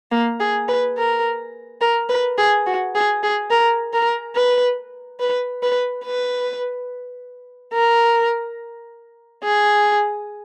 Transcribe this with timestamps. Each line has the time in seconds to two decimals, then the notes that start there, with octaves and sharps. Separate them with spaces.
0.11 A#3
0.40 G#4
0.68 B4
0.97 A#4
1.81 A#4
2.09 B4
2.38 G#4
2.66 F#4
2.95 G#4
3.23 G#4
3.50 A#4
3.93 A#4
4.36 B4
5.20 B4
5.63 B4
6.05 B4
7.74 A#4
9.43 G#4